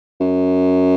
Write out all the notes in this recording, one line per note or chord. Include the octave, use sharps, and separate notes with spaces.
F#2